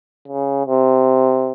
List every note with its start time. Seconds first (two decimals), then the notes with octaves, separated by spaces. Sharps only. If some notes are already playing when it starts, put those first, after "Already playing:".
0.28 C#3
0.67 C3